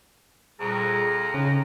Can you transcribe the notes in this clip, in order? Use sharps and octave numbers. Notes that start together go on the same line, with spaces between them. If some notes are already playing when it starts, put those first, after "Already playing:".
F2 A#2 G3 G#4 A#5
C#3 D#4